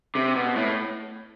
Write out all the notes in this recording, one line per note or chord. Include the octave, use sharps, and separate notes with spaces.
C3
B2
A2